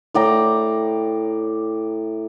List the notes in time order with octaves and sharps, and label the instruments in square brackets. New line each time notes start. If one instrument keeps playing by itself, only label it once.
[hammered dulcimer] A2 D5 G5 A#5